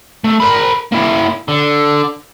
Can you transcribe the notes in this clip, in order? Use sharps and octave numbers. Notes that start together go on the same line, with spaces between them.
A3
A#4 B5
A#3 E4
D3